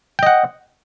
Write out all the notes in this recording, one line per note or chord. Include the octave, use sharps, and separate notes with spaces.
D#5 F#5 G5